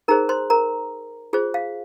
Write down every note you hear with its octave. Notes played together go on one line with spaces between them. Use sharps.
D#4 G#4 A#4 C5 A#5
C5 C6
A#4 A#5
F4 G#4 C5
F5